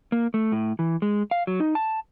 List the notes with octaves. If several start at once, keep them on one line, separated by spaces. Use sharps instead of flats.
A#3
A3
A2
E3
G#3
F5
F#3
D#4
A5